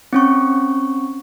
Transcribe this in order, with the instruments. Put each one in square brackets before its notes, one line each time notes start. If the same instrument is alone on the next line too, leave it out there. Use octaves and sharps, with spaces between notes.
[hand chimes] C4 C#4 C#6